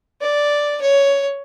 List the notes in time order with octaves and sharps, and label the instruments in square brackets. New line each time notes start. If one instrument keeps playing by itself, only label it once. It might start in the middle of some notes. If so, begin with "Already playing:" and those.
[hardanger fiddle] D5
C#5